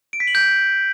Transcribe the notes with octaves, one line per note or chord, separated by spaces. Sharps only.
D7
B6
F#7
G6